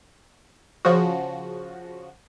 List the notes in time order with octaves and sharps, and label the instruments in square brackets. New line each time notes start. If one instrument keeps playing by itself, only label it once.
[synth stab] C#3 F3 F#4